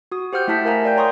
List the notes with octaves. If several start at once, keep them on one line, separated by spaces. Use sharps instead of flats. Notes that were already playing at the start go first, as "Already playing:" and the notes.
F#4 D#6
G4 C5 F#5 F6 G6
A3 E4 E5 A5 B6
A#4 C5 F5 G#5 A#5
A#4 D5 F5 G5 G6
C#5 A#5 C6 C#6 D#6